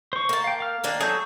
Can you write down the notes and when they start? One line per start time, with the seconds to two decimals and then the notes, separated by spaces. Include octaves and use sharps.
0.13 C5 C#6
0.29 A#3 A5
0.44 F5 G5
0.60 F5 F6
0.84 D#3 A#3 D4
1.01 F#3 G#4 A4 G6